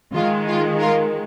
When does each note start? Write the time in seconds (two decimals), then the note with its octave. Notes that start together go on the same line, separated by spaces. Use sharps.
0.14 D#3 G#3 F4
0.47 F4
0.80 F4 A#4